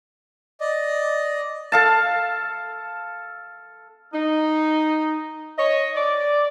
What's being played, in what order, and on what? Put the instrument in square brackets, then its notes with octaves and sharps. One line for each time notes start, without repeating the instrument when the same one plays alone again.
[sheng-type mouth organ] D5 D#5
[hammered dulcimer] A4 F5 A5
[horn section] D#4
C#5 D#5
D5